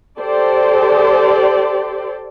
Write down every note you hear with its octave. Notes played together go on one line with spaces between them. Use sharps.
G4 A4 C5 D5